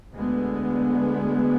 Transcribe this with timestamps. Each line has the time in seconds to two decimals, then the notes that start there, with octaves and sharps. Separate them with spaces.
0.14 D2 D3 G#3 B3